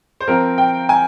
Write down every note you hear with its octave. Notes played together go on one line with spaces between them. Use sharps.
C5
F3 C4 A#4
G5
G#5